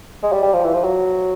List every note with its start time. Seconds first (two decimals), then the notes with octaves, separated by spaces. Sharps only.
0.23 G#3
0.33 G3
0.43 G3
0.53 F3
0.64 E3
0.74 F3
0.84 F#3